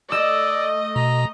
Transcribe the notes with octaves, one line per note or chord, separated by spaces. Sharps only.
A3 D5 D#5 E6
B2 A#5